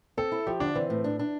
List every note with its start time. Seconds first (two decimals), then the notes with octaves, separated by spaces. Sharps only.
0.17 C4 A4
0.32 E4
0.47 F3 G4
0.60 D3 D4
0.75 E3 C4
0.90 A2
1.04 D4
1.19 D4